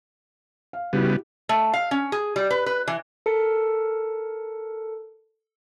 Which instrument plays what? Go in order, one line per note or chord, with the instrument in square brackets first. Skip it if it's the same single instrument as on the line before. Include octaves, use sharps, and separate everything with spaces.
[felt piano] F5
[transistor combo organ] C#3 G3 B3 [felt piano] E4 F#4 G4
[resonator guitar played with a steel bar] A3
F5
C#4
G#4
G3
B4
B4
E3
[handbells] A4 A#4 A5 C#7